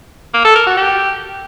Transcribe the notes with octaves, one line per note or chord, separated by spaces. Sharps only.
A#3
A4
A#4
F#4
G4